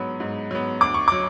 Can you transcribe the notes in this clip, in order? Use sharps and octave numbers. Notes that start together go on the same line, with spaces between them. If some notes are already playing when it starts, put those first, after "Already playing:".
Already playing: G#2 F#3 B3
G#2
F#3 B3
D2 D6
C#6
F#3 D6